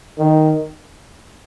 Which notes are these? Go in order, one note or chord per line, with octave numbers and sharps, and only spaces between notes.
D#3